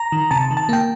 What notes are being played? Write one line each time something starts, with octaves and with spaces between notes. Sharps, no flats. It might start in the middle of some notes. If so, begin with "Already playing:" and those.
Already playing: A#5
D#3
C3 A5
D#3
A5
A#3 G5